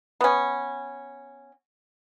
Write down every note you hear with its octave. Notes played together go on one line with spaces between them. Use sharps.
B3 C#4